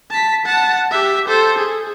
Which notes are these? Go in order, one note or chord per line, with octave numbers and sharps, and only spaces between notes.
A5 B6
F#5 A5
G4 E5
A4 C5
G#4